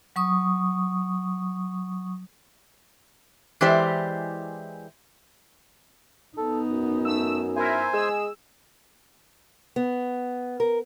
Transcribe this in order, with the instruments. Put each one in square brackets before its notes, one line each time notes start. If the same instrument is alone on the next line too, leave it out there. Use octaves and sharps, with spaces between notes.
[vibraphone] F#3 C#6 D#6
[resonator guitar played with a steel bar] E3 G#3 E4 G4 C5 D5
[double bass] B3 D#4 [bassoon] A4
[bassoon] F#2
[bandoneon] A3 [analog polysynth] E6
[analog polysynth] E4 A#4 E5 [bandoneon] C5 G#5
[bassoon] G#3 [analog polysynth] G#4 E6
[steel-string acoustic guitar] B3
A#4